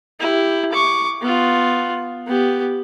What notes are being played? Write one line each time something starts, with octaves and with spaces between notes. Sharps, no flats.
E4 G4
C#6 D6
B3 F4
B3 G4